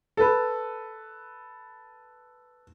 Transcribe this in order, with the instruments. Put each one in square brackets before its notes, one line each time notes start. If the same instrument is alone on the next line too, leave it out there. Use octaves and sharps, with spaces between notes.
[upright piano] A4 B4